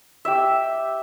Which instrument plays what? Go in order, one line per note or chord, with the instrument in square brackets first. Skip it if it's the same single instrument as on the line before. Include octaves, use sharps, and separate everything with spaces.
[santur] G4 E5